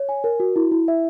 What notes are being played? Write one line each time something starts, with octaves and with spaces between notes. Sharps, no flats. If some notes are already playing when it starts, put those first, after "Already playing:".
Already playing: C#5
G#5
A#4
F#4
E4
E4
E5